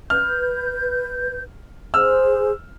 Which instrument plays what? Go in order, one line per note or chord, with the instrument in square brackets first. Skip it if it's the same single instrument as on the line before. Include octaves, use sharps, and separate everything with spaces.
[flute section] B4 G6 [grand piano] F6
[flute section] G#4 C5 [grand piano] E6 F6